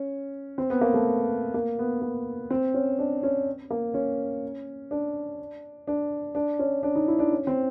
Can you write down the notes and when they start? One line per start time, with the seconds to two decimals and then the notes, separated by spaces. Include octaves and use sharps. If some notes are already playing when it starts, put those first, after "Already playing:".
Already playing: C#4
0.58 C4
0.70 B3
0.81 A#3
0.94 A3
1.54 A#3
1.79 B3
2.02 A#3
2.50 C4
2.74 C#4
2.99 D4
3.23 C#4
3.70 A#3
3.94 C#4
4.91 D4
5.87 D4
6.35 D4
6.59 C#4
6.83 D4
6.95 D#4
7.08 E4
7.19 D4
7.32 C#4
7.47 C4